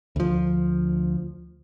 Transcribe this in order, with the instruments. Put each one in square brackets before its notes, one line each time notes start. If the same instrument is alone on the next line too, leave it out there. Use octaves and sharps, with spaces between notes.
[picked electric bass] D2 F3